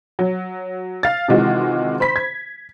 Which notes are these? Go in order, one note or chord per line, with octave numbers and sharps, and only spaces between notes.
F#3
F5 A6
C3 D#3 E3 G#3 F4 F#4
C5 B5 B6
G#6